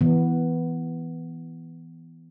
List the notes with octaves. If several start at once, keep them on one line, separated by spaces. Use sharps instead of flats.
E3 B3